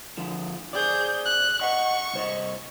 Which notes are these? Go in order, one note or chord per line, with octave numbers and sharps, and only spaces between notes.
D3 F3
G#4 C5 D5 G6
F#6
D#5 F#5 C#6
C2 C5 D#5